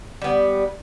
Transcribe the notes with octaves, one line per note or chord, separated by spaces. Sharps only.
G3 B3